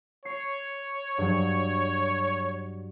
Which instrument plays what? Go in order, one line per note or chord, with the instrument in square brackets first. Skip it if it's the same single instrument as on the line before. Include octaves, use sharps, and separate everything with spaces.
[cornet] C#5 [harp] C7
[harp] G2 F#3